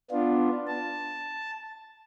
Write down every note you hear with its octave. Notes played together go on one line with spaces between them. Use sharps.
B3 D4 F4
A5